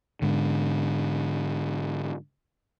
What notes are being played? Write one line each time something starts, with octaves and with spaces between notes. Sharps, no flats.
G#2 D3